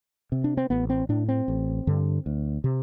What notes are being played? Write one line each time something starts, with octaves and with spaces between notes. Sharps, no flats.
C3
D4
C4
A1 B3
C4
A2 D4
C4
A1
G2 D3
D2
C3